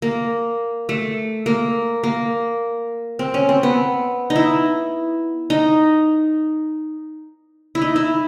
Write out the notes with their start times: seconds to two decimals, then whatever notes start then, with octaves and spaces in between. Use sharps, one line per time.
0.02 A#3
0.89 A3
1.46 A#3
2.04 A#3
3.19 C4
3.34 C#4
3.49 C4
3.63 B3
4.30 D#4
4.36 E4
5.50 D#4
7.75 E4
7.81 D#4
7.96 E4